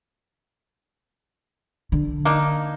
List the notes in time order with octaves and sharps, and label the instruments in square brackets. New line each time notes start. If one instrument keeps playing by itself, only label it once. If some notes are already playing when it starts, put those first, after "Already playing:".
[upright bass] D3
[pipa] A#3 D4 D#4